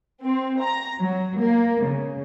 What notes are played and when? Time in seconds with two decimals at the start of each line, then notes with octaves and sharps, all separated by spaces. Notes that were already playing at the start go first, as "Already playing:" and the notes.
0.22 C4
0.61 A#5
0.98 F#3
1.39 A#3
1.86 C#3